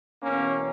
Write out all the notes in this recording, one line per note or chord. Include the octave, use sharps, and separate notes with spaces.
E2 B2 A#3 C#4